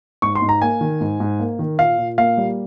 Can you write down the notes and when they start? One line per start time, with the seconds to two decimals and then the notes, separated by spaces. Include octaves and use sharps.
0.22 G#2 C#6
0.35 C6
0.42 G#2
0.49 A#5
0.61 A#3 G#5
0.81 D#3
1.01 G#2
1.20 G#2
1.40 A#3
1.59 D#3
1.79 A#2 F5
1.98 A#2
2.18 A#3 F5
2.38 G3